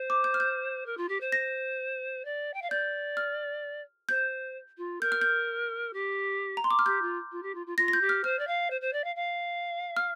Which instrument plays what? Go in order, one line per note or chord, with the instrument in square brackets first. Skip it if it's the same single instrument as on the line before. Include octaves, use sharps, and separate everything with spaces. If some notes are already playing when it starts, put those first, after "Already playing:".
Already playing: [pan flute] C5
[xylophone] D6
G6
F6
G6
[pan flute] A#4
F4
G4
C5
[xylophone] A#6
[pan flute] D5
G5
F5
[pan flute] D5 [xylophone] G6
[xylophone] F6
[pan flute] C5 [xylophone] G6
[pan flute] F4
[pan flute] A#4 [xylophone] G6
[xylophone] F6
G6
[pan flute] G4
[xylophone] A#5
C6
D6
F6
[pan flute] G4 [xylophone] G6
[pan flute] F4
F4
G4
F4
F4
[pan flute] F4 [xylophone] A#6
[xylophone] A#6
G6
[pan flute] G4
[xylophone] F6
[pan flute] C5 [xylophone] F6
[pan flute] D5
F5
C5
C5
D5
F5
F5
[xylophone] F6